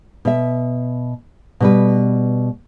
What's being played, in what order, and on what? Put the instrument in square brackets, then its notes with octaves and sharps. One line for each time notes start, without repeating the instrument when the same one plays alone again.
[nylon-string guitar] B2 E5
B2 G3 B4